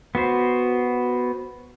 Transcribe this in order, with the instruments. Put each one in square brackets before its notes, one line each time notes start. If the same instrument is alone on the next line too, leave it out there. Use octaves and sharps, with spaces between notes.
[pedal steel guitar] B3 F#4 C5